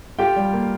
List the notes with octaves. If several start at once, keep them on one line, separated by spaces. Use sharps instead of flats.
F4 G4 G5
G3
A#3